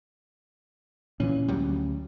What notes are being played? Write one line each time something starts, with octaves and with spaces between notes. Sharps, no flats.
A#2 E3 C#4
D2 F#3 G3